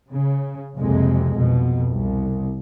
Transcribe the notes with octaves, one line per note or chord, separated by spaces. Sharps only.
C#3
F#1 C2 F2 C3 G#3
F2 B2
C2